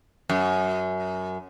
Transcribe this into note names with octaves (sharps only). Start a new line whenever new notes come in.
F#2